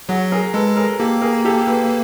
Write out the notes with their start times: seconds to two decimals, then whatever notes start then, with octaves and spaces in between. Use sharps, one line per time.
0.09 F#3 F#4 G#4
0.32 G#4 A#4
0.54 G#3 A4 B4
0.77 G#4 A#4
0.99 A#3 G4 A4
1.22 G#4 A#4
1.45 G4 A4
1.67 A4 B4